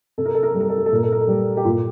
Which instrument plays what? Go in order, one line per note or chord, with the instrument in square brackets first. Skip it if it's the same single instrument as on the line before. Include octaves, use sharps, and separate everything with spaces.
[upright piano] C3 A4
A#4
A4
A#4
G3 A4
A#4
A4
A#4
A4
A#2 A#4
A4
A#4
A4
G3
G4
A#2 F4